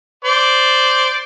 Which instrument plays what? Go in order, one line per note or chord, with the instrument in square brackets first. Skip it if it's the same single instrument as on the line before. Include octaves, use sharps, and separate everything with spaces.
[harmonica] C5 D5